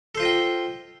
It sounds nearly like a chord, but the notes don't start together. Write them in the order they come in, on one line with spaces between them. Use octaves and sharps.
A4 C5 F4 D#5 G5